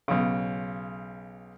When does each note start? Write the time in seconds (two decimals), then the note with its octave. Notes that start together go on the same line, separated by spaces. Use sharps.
0.08 B1 C#3